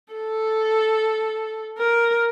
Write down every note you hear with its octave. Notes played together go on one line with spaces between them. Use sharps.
A4
A#4